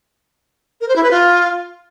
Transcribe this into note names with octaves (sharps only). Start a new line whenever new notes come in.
A#4
C5
E4
B4
F4